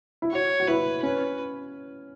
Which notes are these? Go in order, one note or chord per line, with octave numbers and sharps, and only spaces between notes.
E4
F#4 C#5
F#4
E4 B4
C#4 B4